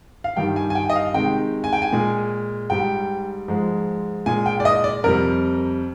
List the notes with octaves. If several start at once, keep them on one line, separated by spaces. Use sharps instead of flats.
F5
G2 D#3 G3 G5
G#5
G#5
G5
D#5
F5
C3 D#3 G#3 G5
G#5
G5
G#5
A#2 G#3
G#2 G3 G5
G#2 F3 G#3
A#2 G#3 G#5
G5
D5
D#5
D5
F2 C3 G3 A#4